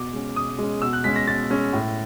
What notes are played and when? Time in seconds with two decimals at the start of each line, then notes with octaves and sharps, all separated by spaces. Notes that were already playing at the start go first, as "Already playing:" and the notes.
Already playing: B2 D6
0.13 G#3 C#4
0.36 B2 D#6
0.59 G#3 C#4
0.82 B2 E6
0.93 F#6
1.04 G#3 C#4 B6
1.16 A#6
1.28 B2 A6
1.50 G#3 C#4
1.73 A2